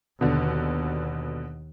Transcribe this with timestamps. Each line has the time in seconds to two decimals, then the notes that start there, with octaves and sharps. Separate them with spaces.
0.21 D#2 B2 D3